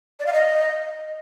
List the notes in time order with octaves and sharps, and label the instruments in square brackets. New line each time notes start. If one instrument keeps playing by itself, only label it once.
[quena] D5
F5
D#5